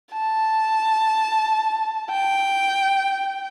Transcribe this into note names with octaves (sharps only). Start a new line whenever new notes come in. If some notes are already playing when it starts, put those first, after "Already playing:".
A5
G5